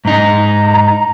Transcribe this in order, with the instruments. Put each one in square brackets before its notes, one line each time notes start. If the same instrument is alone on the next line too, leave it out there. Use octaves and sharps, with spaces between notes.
[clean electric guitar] G#2 D#4 [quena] A#5